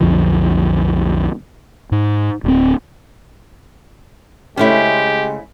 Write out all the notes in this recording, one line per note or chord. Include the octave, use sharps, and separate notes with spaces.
B1 F2 D3 F3
G#2
D1 C4
C#3 G#3 A3 C#4 E4 G4 C5